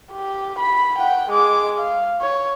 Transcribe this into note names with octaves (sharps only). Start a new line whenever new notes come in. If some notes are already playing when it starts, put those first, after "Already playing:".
G4
B5
F#5 G5
G#3 D6
F5
C#5